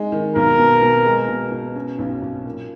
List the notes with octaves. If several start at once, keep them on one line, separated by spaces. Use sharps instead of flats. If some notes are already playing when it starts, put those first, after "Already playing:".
Already playing: G#3 D#4
D#3
B1 A#4
B2
B2
G#3
B2
B2
C#4
B1
B1
A#2